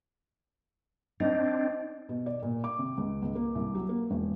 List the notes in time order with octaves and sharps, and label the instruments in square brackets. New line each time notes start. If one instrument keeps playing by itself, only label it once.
[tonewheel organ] C4 D4 [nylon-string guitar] D#4
[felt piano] B2
D5
A#2
D6
C3
C#2
C#2
A#3
C2
F#3
A#3
E1